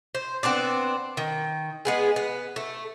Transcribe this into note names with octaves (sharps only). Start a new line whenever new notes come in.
C5
B3 C4 D4 D5
D#3
G#3 B3 G#4
B3
A3